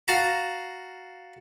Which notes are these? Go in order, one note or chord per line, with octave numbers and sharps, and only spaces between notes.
F#4 F5 A5 A#5